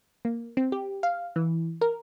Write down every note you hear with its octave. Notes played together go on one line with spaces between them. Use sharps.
A#3
C4
G4
F5
E3
A#4